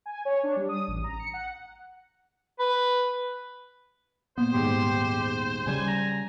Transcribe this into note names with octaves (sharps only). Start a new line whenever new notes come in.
G#5
C#5
D4
G3
D#6
A1
A#5
C#7
F#5
B4
A#2 B3 C5
D#1 G#2 G4 C6
C#3 G3 G#5
A#5